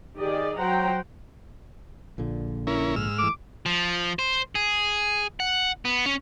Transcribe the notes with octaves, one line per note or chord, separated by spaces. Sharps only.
D#3 G4 G#4 D5 D#5
F#3 C5 F#5 G5 A#5
A#1 A#2 D3
C#4 E4 A#4
G#2 E6 F6
E3 A3 D6
F3
C5
G#4
F#5
B3
C#4